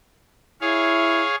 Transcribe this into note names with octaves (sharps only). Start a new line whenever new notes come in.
E4 G#4 C#5 F5